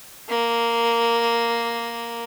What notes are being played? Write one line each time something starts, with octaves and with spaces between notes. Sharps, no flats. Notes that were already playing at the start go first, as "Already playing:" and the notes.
A#3